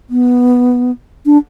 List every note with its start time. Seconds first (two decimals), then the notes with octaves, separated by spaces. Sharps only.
0.10 B3
1.26 D4